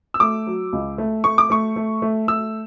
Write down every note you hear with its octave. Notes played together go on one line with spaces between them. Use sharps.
E6
A3 D6
F#3
C#2
A3
A3 C#6
D6
A3 C#6
A3
A3
A3 E6